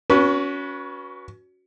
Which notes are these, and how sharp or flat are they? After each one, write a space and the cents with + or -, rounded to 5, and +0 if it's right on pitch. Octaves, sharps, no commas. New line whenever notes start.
C#4 +25 F#4 +0 B4 -20